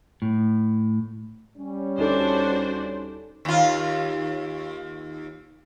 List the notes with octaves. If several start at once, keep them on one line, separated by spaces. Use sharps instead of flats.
A2
G3 C#4
D2 D4 D#4 F#4 A4 C5
D#2 F4